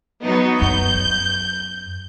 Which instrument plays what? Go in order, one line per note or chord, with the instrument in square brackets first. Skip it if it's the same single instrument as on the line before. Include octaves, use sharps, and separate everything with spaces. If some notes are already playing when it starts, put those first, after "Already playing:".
[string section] F#3 B3 D#4
[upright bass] F#2 [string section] G6